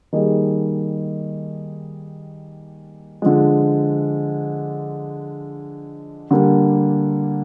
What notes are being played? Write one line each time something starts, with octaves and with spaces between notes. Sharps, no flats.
D#3 G3 A#3 D#4 G#4
D3 F3 G#3
D3 G3 A#3